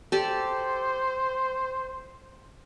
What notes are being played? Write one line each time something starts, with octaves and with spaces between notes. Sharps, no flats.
G4 A4 C5 D5